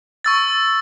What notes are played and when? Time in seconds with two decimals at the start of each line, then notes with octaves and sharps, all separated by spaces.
0.25 C#6 E6 A6